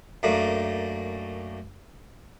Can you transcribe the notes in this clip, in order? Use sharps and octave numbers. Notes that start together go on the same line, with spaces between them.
F#2 A3 A#3 D4